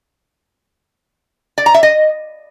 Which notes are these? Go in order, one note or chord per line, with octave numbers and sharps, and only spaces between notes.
D5
A#5
E5
D#5